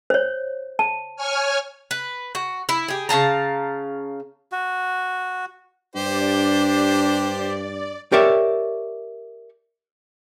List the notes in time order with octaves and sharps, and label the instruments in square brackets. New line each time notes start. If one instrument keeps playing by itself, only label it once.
[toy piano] C5 C#5
A5
[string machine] C#5 G#5 F6
[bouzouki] B4
F#4
E4
G4 G#4
C#3 F5 A5 A#5
[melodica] F#4
[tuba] G2 [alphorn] D4 [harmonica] G4 C5 [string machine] D5
[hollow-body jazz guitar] G4 A#4 C#5 D5 E5